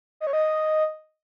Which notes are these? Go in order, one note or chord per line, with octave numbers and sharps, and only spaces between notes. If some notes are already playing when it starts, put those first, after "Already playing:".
D#5
C#5
D#5